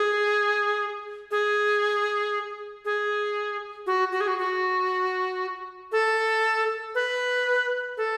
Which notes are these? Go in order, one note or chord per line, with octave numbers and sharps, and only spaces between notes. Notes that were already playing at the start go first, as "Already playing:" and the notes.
Already playing: G#4
G#4
G#4
F#4
F#4
G#4
F#4
F#4
A4
B4
A4